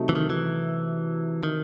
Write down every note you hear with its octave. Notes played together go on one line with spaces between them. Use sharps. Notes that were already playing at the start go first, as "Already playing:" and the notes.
Already playing: C3 F#3 A3 D#4
E3
D#3
E3
D#3